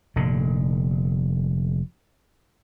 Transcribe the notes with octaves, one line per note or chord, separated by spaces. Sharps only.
F1 A#2 D3